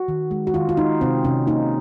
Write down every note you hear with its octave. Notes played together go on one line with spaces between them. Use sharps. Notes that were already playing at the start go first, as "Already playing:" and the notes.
Already playing: F#4
D#3
G#3
F#4
D#3 F4
F4
G#3 D#4
C3 C4
C3 C#4
A#3 D#4